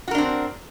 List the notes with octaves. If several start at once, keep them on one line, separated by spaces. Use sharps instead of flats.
C4 D4 F#4 A#4